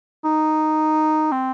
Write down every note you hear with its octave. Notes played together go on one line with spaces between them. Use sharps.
D#4
C4